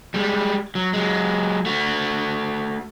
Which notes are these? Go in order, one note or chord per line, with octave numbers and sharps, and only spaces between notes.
G3 G#3
F#3
F#3 G#3
A3 F#4